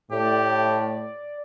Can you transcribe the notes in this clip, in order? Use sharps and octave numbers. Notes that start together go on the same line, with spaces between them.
A2 G4 D5